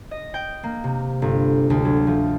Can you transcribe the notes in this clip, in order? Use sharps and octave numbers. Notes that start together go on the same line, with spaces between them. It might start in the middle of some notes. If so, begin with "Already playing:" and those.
D#5
G5
A#3
C3
G1
D2
F#3
F3